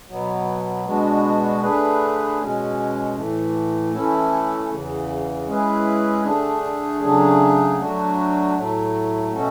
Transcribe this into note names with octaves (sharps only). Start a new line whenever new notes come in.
B2 F#3 B3
B2 G#3 B3 D4 F#4
D3 A3 D4 G#4 B4
B2 G#3 C#4
A2 E3 A3
E3 A3 C#4 E4 A4
E2 C#3 E3
G#3 C#4 E4 G#4 B4
D3 A3 D4 G#4
C#3 F#3 A3 D4 G#4
F#3 A3 D4 F#4
A2 F#3 A3
B2 A3 C#4 F#4 A4